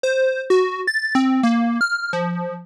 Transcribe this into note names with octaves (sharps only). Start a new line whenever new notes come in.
C5
F#4
A6
C4
A#3
F6
F3